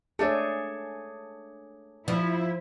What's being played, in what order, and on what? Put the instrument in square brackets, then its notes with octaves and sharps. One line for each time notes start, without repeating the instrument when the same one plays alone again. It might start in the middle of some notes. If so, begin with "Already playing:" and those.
[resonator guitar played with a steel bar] A3 D4 E5 [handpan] G#4 C#5
[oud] F3 [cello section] E4